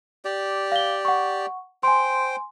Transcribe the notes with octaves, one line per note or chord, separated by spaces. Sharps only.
G4 D5
F5 G7
F#5 C#6
C5 G5 G#5 C6